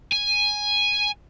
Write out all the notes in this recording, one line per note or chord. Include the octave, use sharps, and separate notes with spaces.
G#5